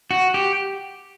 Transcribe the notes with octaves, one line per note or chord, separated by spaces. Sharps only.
F#4
G4